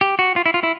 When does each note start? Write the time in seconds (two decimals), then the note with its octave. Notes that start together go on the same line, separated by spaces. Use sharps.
0.01 G4
0.19 F#4
0.36 F4
0.46 E4
0.54 F4
0.63 E4